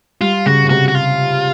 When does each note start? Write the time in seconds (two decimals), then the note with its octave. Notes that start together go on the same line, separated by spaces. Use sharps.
0.21 G3 F4
0.46 C#3 F#4
0.64 C#3
0.70 C3 F#4
0.88 F#4
0.95 F4